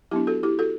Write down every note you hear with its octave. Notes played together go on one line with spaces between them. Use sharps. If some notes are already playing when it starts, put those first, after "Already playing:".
F#3 B3 D4 E4 G4
F#4 A4
E4 G4
F#4 A4